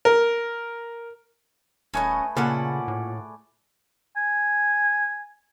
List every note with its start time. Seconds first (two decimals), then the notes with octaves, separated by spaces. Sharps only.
0.05 A#4
1.94 D#1 A3 C#4 G#4 B4 C#5 D#5
2.37 A#2 C#3 C#4 A4 D5 F#5
2.88 A2
4.17 G#5